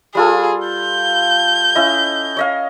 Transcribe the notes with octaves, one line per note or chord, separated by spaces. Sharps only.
G3 F4 G#4 A4
G6
C#4 E4 D#5
C#5 D#5 F5